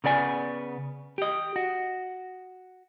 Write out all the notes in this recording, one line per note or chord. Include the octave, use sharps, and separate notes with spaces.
C#3 B3 D5 G#5
G4 D#5
F#4